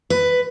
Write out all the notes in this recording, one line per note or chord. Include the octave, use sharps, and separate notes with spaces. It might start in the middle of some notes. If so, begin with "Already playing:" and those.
B4